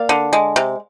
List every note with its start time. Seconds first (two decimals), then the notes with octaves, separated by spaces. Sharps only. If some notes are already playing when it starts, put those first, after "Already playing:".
Already playing: A#3 D5 F5
0.09 D3
0.33 G#3
0.56 C3